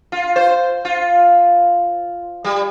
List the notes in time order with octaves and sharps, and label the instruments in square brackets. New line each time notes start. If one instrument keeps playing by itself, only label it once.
[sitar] F4
C5
F4
G3